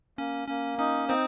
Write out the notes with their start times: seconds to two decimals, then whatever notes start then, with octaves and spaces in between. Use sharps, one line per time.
0.18 A#3 C#4
0.48 A#3 C#4
0.78 C#4 D#4
1.09 C4 D#4 C5